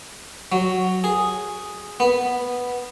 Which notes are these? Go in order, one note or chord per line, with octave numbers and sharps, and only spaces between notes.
F#3
G#4
B3